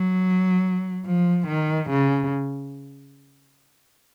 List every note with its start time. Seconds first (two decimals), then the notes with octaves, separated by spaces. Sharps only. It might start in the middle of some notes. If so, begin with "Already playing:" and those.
Already playing: F#3
1.06 F3
1.48 D#3
1.90 C#3